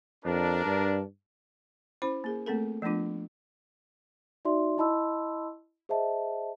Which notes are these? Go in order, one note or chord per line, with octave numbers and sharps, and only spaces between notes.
F2 D4 A#4
G2
C#4 E4 C5 B5
A#3 G#4 A#4
A3 A#3 C4 A4 A#4
F3 A3 B3 D4 F4
D#4 F#4 D5 E5 C6
E4 D#5 A5 B5 C6 E6
G#4 C5 D#5 E5 A5